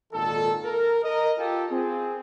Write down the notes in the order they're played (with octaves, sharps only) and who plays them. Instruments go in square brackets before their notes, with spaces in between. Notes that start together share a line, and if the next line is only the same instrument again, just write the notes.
[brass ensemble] G#1 A#2 D#3 A4
A#4
A#4 D#5
F4 G4 A4
C4 G#4